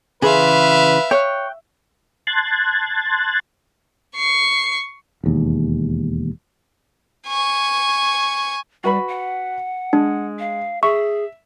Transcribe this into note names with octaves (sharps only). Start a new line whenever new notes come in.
C#3 E3 G#4 B4 E5 F5 C6
C#5 G5 F#6
A5 C6 F#6 G#6 A6
C#6 C7
E1 D#2
G#5 C#6
G3 F#4 B4 B5
F#5
G#3 D4
F5
G#4 E5 C#6